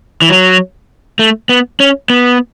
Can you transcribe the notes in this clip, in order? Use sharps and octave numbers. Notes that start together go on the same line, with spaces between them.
E3
F#3
A3
B3
C#4
B3